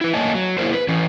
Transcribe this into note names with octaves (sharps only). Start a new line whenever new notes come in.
E4 B4
A3 A#3 C#5 D#5 G#5 A5
F#3
A#3 E4 F4 G#4 A#4 C5
B4
E3 C#4